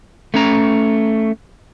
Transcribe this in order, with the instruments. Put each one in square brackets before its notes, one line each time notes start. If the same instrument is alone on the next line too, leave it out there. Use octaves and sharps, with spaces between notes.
[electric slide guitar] A3 C#4 A#5